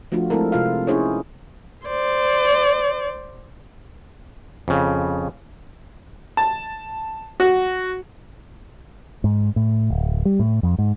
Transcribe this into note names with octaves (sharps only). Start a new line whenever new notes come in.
F3 A3 D4 F4 F#4
G#3 A3 C4 E4 A4 A#4
C3 F4 F5
C#4 D#4 E4 G#4 C5 C#5
C5 D5
F2 C#3
A5
F#4
G#2
A2
D1
G3
A2
F2
G#2